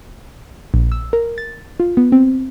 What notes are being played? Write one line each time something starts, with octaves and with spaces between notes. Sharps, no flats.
A#1
E6
A#4
A6
F4
B3
C4